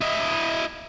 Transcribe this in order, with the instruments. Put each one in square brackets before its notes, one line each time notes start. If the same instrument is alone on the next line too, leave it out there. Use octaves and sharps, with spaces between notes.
[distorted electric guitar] E4 D#5